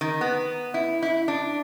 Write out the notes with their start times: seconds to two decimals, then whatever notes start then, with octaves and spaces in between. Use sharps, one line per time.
0.01 D#3
0.21 B3
0.74 E4
1.02 E4
1.28 D4